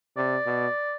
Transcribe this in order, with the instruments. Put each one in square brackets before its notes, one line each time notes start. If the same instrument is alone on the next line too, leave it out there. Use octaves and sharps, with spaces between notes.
[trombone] C3 [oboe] D5
[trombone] B2